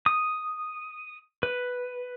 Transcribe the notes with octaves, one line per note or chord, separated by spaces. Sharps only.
D#6
B4